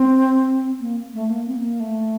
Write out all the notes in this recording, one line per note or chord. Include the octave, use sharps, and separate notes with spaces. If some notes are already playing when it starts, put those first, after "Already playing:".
Already playing: C4
A#3
A3
A#3
C4
A#3
A3